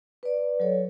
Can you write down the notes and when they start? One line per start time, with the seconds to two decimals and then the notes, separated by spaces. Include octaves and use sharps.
0.23 B4 D5
0.60 F#3 A4 C#5